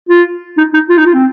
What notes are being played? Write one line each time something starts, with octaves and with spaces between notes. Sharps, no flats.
F4
D#4
D#4
F4
D#4
F4
C4